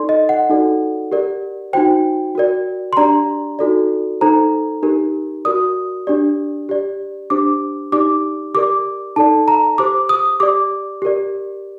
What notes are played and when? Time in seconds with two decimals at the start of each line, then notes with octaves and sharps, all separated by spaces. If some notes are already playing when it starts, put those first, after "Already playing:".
Already playing: D#4 A4 D5 C6
0.09 D#5
0.29 F#5
0.49 D#4 F#4 A4 D5
1.12 G4 A#4 D5
1.73 D#4 F#4 C5 G5
2.35 F#4 A#4 D5
2.93 C6
2.97 D4 G4 D5 A#5
3.59 D#4 F#4 A4 D5
4.21 D#4 A4 C5 A#5
4.83 D#4 G4 A#4
5.45 F#4 A#4 D5 D#6
6.07 D4 G4 D5
6.69 G4 D5
7.30 D4 G4 C5 D6
7.92 D#4 G4 D5 D6
8.54 G4 A#4 D5 D6
9.16 D#4 A4 D5 A5
9.48 A#5
9.78 G4 C5 D6
10.09 D#6
10.40 G4 D5 D6
11.02 G4 A#4 D5